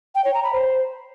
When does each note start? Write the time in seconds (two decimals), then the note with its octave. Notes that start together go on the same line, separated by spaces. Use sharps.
0.15 G5
0.25 C#5
0.34 A#5
0.43 B5
0.53 C5